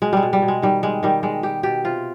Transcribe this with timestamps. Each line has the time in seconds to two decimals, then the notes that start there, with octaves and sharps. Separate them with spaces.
0.02 B2 G#3
0.13 G3 G#3
0.23 B2
0.33 G3
0.42 B2
0.48 G#3
0.62 D#3 G3
0.83 G3 G#3
1.03 D#3 G3
1.23 G3 G#3
1.43 G3 G4
1.63 B2 G4
1.84 C3 F4